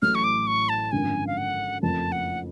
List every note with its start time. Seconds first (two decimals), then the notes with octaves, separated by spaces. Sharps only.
0.02 A1 A2 F#3 A3 F6
0.15 C#6
0.24 D6
0.47 C#6
0.69 A5
0.92 G#1 F#2 D3 F3 G#5
1.27 F5
1.37 F#5
1.82 F#1 F2 F3 A3 A5
2.12 F#5